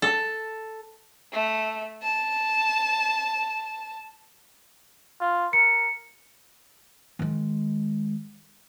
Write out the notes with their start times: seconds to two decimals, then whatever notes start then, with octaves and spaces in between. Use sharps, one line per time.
0.02 A4
1.33 A3
2.03 A5
5.21 F4
5.53 A#4 C#7
7.19 D#3 G#3